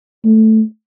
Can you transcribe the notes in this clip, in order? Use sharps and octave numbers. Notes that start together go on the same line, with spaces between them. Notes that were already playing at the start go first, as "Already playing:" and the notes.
A3